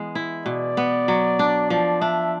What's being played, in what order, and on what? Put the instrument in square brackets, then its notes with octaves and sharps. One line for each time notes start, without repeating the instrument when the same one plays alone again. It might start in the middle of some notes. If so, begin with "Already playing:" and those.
Already playing: [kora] E3 G#3 B3
E4
[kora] B2 [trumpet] D5
[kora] B3
F#3
D4
[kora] F3 [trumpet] D5
[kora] D4 [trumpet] E5